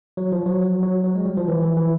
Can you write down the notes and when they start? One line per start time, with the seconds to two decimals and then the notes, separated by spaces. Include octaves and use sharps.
0.17 F#3
0.32 F3
0.46 F#3
0.61 F#3
0.83 F#3
1.04 F#3
1.15 G#3
1.26 G3
1.37 F3
1.48 E3
1.62 E3
1.77 E3